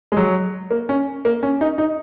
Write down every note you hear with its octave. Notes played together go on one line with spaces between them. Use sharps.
G#3
F#3
A#3
C#4
A#3
C#4
D#4
D#4